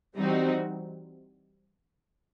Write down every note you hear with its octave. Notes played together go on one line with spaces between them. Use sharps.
E3 G3 C4 D#4 F#4